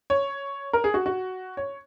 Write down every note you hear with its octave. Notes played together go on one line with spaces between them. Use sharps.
C#5
A#4
G#4
F#4
F#4
C#5